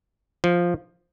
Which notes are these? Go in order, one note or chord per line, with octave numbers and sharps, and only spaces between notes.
F3